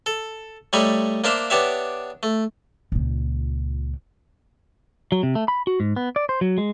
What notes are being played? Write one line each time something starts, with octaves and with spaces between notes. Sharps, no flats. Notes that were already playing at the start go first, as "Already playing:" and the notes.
A4
G3 A3 D#4 C#5 B5
A#3 D4 C5 E5 F5
B3 D4 G4 C#5 E5
A3
C#2 A#2
F#3
C3
A3
B5
F#4
G#2
B3
D5
C5
F#3
G#3